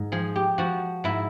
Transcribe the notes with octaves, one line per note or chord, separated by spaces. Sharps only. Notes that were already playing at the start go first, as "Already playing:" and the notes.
Already playing: G#2
F3 G#4
G4
F3 F#4
G#2 E4